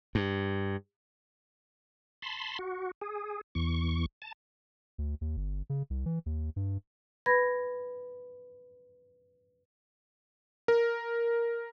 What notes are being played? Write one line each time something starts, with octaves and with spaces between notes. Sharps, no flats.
G2
A5 B5 C6
F#4
G#4
E2 C#6
A5
D2
D#2
G1
C#3
C2
E3
D#2
G2
B4 B5 G#6 A#6
A#4